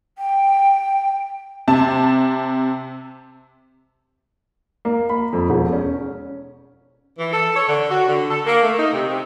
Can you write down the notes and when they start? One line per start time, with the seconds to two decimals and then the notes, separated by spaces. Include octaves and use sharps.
0.18 G5
1.68 C3 A5
4.85 A#3
5.09 B5
5.33 F2
5.50 E1
5.73 C#4
7.19 E3
7.33 A4
7.55 C#5
7.69 D3
7.90 F#4
8.08 D3
8.30 A4
8.46 A#3
8.63 A3
8.79 D#4
8.93 C3
9.09 C3